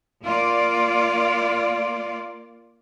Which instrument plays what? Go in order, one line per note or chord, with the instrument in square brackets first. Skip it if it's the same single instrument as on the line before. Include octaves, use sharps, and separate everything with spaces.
[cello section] A#3 F4 D5